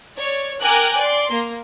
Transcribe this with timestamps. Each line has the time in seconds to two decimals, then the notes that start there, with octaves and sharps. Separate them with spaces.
0.17 C#5 D5
0.60 A#4 G5 G#5 D6 F#6
0.97 D5 C6
1.31 A#3